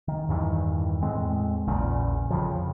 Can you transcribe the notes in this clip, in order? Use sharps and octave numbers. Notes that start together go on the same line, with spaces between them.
D#3
E2 G2 D#3 E3
E2 A2 G#3 C4
A#1 E2 A#2 C#3
F2 C#3 F3